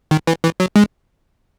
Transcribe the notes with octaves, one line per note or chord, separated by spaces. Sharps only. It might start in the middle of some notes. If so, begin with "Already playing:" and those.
D#3
E3
E3
F#3
G#3